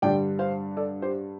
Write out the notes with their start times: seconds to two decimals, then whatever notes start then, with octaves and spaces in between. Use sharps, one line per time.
0.02 G2 D3 G3 D5 G5
0.39 C5 F5
0.77 A4 D5
1.02 G4 C5